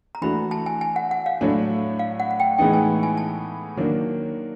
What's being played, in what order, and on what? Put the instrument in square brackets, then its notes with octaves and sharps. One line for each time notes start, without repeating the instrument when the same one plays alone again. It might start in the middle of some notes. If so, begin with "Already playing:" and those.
[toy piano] A#5
[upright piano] E3 A3 D4 F#4 [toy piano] B5
[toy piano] A5
G#5
G#5
F#5
F#5
F5
[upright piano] A2 F#3 A3 D4
[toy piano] F5
F#5
F#5
G5
[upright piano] A2 E3 G#3 B3 D#4 [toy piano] G5
[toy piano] G#5
G#5
A5
[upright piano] D#3 F#3 A#3 D4